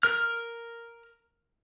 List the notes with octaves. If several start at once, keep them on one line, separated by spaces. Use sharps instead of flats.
A#4 F6